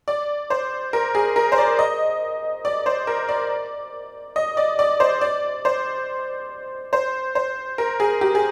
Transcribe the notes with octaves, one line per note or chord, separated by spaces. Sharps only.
D5
C5
A#4
G#4
A#4
C5
D5
D#5
D5
C5
A#4
D5
D#5
D5
D5
C5
D5
C5
C5
C5
A#4
G#4
G4
G#4